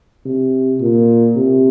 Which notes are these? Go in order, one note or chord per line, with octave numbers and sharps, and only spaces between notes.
C3
A#2
C3